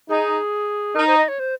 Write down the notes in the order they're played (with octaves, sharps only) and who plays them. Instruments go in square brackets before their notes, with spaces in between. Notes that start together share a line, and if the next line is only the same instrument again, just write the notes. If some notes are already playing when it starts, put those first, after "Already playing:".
[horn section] D#4 [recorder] G#4
[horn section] D#4 [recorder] A#4
[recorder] C5
D#5
C#5
C5